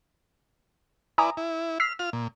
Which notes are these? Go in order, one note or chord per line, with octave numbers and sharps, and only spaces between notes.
E4 B4 D5 G#5 A#5 D#6
E4
E6 F6 B6 C7
F4 F6
A#2